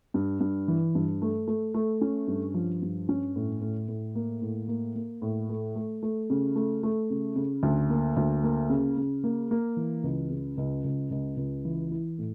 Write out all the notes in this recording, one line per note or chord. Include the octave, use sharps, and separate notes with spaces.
G2
G2
E3
G2
A3
A3
A3
C#4
G2
F3
G2
C#4
A2
A2
A2
A#3
A2
A#3
A#3
A2
A3
A3
A3
C#3
A3
A3
C#3
C#3
D2
A#3
D2
A#3
C#3
C#3
A#3
A#3
E3
C#2
C#3
C#2
C#2
C#2
C#2
E3
E4
A2